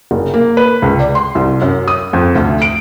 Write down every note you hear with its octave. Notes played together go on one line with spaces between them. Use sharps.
F#1
A#3
B4
C#2
D5
C6
C2
F#2
D#6
F2
D2
D7